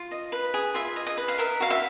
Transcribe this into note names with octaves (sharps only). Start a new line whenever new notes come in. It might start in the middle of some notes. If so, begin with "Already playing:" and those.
Already playing: F4
D#5
B4
G#4
F4 E5
D#5
D#5
B4
F5
A#4 E5
F#4 F5
E5